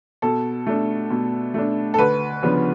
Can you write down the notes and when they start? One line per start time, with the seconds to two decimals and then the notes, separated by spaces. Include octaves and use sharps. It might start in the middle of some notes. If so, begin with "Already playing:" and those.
0.22 B2 A4
0.67 A3 D4
1.10 B2
1.54 A3 D4
1.94 A4
1.98 D2 B4
2.42 C#3 F3 B3 D4